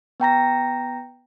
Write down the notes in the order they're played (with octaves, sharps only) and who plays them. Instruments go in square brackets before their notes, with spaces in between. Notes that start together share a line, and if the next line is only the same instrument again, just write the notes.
[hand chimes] B3 G5 A#5 A#6